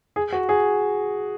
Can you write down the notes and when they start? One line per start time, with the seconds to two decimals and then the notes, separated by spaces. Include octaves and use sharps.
0.16 G#4
0.32 F#4
0.49 G#4